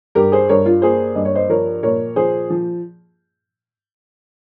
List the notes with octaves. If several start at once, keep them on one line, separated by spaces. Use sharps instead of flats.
G2 G4 A#4
G#4 C5
G2 A#4 C#5
F4
A#3 G#4 C5
G2 D#5
C#5
C5 D#5
F3 A#4 C#5
A#2 A#4 C#5
F3 G#4 C5
F3